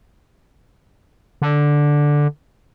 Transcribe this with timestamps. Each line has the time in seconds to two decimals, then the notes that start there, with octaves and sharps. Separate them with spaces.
1.42 D3